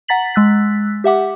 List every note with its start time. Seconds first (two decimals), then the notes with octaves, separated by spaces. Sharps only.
0.08 F#5 A#5 A6 B6 F#7
0.34 G#3 E6 F#6 A6 B6
1.04 G4 E5 F#5 D6